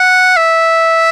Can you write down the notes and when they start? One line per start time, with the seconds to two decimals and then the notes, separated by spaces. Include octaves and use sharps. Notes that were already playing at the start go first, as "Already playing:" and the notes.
Already playing: F#5
0.37 E5